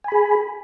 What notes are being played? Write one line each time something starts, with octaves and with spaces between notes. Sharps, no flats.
G#4 G#5 B5